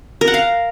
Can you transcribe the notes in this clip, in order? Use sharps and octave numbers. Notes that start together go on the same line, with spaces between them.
A#4
F#5
F5